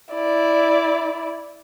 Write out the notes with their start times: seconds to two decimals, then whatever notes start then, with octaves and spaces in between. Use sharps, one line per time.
0.14 E4 D5